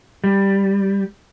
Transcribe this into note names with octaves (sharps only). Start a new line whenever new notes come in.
G3